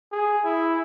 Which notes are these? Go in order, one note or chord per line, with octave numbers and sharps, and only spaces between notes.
G#4
E4